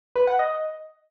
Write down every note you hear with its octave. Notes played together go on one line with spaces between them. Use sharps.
B4
F#5
D#5